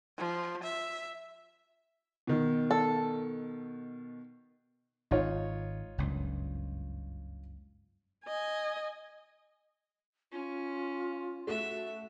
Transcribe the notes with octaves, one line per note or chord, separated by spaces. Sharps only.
F3
E5
B2 D#3
A4
G#1 D#4 F4 C#5
F#1 C#2 G2
D#5 G#5
C#4 F4
A3 F#4 A4 E5